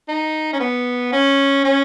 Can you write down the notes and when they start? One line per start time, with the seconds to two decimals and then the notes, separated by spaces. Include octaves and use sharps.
0.08 D#4
0.53 C#4
0.60 B3
1.12 C#4
1.64 C#4